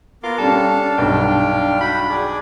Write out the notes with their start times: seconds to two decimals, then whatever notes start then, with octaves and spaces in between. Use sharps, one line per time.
0.23 B3 F4 A#4 D6
0.38 G3 C#4 D4 A4 F5
0.98 B1 G2 G5
1.81 F#4 G5 B5
2.10 G#4 D5